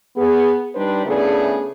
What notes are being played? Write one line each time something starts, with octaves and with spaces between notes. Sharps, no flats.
B3 G#4
G3 D4 D#4 B4 C5
C#3 A3 B3 D4 E4 G#4